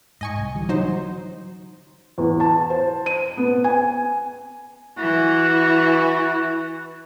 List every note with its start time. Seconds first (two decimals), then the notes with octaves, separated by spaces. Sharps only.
0.21 G#2 D#5 G#5 C#6
0.37 C2
0.54 D3 E3 G3
0.69 F#3 D#4 C5
2.18 E2
2.40 A5
2.70 C5
3.06 D#7
3.37 B3
3.64 G#5
4.98 E3 F#4